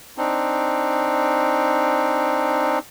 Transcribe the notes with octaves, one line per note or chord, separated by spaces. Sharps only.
C4 D4 D#4